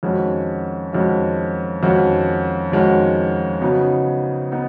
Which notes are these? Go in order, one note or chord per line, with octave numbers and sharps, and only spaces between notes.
F2 D#3 G#3 C#4 F#4
F2 D#3 G#3 C#4 F#4
F2 D#3 G#3 C#4 F#4
F2 D#3 G#3 C#4 F#4
C#3 F#3 B3 D#4
B3 D#4